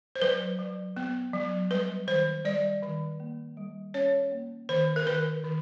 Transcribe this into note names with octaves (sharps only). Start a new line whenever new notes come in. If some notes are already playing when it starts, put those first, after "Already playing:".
C5
F#3 B4
F#3
B3
F#3
G3 B4
D#3 C5
G3 D5
D#3
A#3
G3
C#4 C#5
A#3
D#3 C5
A#4
D#3 B4
D#3